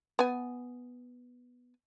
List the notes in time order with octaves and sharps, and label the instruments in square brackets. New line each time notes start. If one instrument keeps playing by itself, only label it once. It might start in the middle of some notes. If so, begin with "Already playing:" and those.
[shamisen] B3 G#5